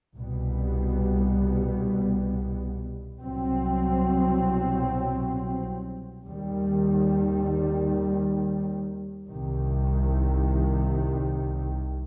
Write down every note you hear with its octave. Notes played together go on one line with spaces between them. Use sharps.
C2 B2 G3 B3
C2 B2 F#3 C4
D#2 D#3 G3
C2 C3 D#3